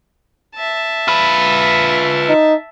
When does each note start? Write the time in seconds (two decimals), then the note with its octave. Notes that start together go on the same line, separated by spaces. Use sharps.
0.56 E5 A5
1.08 F4 B4
2.29 D#4